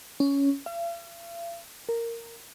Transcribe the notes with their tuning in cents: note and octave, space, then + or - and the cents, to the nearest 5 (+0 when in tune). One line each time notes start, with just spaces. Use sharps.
C#4 +10
F5 -45
A#4 -10